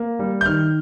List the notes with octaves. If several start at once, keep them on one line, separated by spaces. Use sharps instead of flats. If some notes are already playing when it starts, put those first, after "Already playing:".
Already playing: A#3
G3
G6
D#3 F6